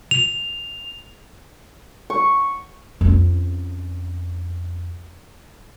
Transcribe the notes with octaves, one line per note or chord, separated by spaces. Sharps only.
F7
C#6
F2 C#4